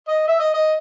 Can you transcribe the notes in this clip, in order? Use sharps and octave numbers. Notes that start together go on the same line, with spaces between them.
D#5
E5
D#5
D#5